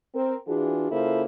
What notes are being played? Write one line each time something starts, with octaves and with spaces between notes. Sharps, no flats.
C4 A#4
E3 D4 F4 F#4 G#4
C#3 A#3 E4 F4 A4 C5